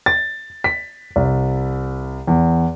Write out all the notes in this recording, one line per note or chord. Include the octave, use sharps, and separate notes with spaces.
A6
B6
C2
E2